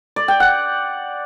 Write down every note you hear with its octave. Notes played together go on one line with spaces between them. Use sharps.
D5
G5
F#5